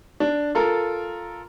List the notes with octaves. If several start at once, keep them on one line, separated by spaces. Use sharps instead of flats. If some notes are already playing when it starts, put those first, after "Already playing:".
D4
F4 A4 A#4